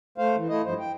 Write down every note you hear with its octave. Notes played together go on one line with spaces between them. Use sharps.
A3 C5 F5
E3
A3 E4 D#5
G2 F3 C5
G5